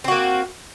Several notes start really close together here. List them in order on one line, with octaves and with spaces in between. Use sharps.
C4 F#4 A#3